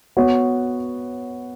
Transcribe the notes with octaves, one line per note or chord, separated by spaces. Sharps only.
B3 F#4 C#5